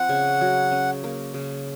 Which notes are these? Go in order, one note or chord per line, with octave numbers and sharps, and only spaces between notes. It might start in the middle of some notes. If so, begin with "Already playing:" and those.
Already playing: F3 C4 F#5
C#3
F#3
C#4
A#3
C#3